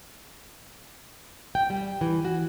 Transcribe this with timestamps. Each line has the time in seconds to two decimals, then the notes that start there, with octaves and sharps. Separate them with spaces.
1.55 G5
1.70 G3
2.01 E3
2.25 F#4